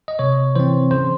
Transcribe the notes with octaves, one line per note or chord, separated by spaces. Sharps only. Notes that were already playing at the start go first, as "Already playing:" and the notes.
D#5
C3 C#5
E3 C4 C5
C#3 C5